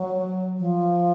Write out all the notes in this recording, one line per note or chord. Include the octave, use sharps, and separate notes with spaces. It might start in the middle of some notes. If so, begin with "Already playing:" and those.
Already playing: F#3
F3